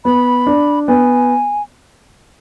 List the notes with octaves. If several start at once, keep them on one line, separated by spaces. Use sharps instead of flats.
B3 B5
D4
B3 G#5